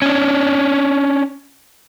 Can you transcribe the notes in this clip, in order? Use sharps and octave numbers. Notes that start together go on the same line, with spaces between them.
C#4 D4